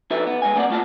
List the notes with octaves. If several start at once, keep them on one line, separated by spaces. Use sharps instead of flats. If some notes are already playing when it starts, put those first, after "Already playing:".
F3 D#4 F#4 A4 B4 E5
B3
G#3 B3 G#5
A3 A#3 C4 D5 F#5
B1 A3 B3 F4 D#5 A5